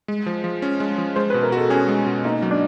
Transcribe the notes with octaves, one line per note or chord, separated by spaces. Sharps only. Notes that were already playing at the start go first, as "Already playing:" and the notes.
G#3
F3
F3
C#4
G#3
F3
G#3 C5
B4
B2
A#4
F#4 A4
C#4 G#4
G#3
B2
A#3 D#4
F#3
D4